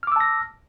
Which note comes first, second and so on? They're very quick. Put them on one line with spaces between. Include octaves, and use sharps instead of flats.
F6 D6 E6 A5 A#6